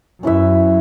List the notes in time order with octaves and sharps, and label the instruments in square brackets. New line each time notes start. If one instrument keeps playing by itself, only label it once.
[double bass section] F#2 [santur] C#4 E4 B4 E5